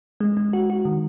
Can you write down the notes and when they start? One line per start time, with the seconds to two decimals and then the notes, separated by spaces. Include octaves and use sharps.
0.21 G#3
0.37 G#3
0.53 F#4
0.70 F#4
0.85 D#3